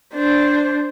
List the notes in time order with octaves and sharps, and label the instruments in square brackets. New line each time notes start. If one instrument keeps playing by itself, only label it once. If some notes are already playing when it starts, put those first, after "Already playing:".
[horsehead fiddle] D4 C5